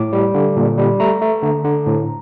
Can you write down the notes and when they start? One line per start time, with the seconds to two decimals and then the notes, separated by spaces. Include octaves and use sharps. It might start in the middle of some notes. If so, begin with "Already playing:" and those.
Already playing: A2 D6
0.13 G3
0.34 D3
0.57 A#2
0.78 G3
1.00 A3 A#5
1.21 A3
1.43 D3
1.65 D3
1.87 A2